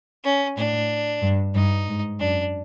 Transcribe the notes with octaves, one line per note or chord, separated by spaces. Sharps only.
C#4
A2 D4
G2
G2 D#4
G#2
F#2 D4